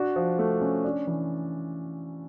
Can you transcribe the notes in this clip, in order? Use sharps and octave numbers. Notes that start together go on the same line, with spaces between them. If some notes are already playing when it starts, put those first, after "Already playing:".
Already playing: D4 F#4
F3
A3
C#4
D4
E3